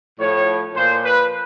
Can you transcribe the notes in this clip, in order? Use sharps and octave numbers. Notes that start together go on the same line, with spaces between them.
A2 F3 C#5
A#2 F3 C5
B4